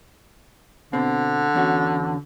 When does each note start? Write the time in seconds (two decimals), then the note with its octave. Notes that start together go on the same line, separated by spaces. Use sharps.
0.93 B2 D3 C4
1.55 E2 C#4 F#4